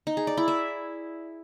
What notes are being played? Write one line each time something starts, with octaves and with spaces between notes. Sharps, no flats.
D#4
G#4
D5
E4
E5